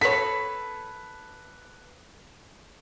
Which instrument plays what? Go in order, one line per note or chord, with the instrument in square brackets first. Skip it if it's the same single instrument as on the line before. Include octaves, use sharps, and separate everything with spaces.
[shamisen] F#4 C#5 [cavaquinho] A4 B4 [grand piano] B6